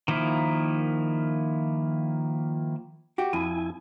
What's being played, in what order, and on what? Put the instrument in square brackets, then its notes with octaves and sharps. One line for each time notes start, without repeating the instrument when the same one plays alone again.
[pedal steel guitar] D#3 F3 A#3 E4
[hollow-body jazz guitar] F#4 G4
[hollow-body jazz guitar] F2 [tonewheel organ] E4 G#5